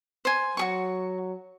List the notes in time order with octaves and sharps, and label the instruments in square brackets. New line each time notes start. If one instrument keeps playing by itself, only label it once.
[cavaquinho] C5 G#5
[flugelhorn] F#3 [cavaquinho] F#4 G#4 C#6